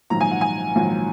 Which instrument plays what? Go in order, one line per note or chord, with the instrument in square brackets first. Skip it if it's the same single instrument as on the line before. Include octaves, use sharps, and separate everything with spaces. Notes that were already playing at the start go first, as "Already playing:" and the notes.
[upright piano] A#1 G#2 D#3 F#3 A#3 A#5
G#5
F#5
G#5
A#1 G#2 D#3 F#3 A#3